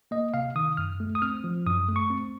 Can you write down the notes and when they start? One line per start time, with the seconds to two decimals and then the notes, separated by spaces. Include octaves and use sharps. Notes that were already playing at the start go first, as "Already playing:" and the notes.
0.11 A#3 D#5
0.34 C3 F5
0.55 D#3 D#6
0.77 F#2 F6
1.00 A3
1.15 D#6
1.22 C4 F6
1.44 F3
1.66 F#2 D#6
1.88 A3
1.96 C#6
2.10 C4